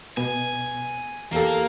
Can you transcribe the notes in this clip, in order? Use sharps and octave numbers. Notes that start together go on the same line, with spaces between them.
B2 B3 G#5
E2 A#3 G4 A4